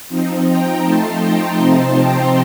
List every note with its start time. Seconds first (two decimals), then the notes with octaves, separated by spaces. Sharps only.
0.09 F3 C4 D#4
0.46 G5 A#5
0.83 F3 A3 D#4 A5 C6
1.21 G5 A#5
1.57 C3 F3 C4 D#4 A5 C6
1.95 G5 A#5